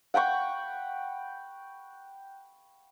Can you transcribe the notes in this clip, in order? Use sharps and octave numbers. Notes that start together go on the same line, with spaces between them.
F#5 G5 B5 C#6